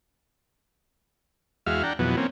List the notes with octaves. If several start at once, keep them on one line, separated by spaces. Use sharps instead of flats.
E2 G#3 F#4 E5 F5 F6
D4 F#5 G5 A#5
F2 B2 E3 F#3 B3
A#3 C4 C#4